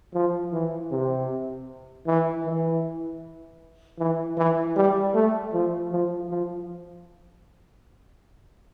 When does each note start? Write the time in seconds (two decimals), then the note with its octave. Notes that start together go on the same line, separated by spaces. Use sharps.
0.14 F3
0.53 E3
0.91 C3
2.07 E3
2.45 E3
3.99 E3
4.38 E3
4.77 G3
5.15 A3
5.53 F3
5.92 F3
6.30 F3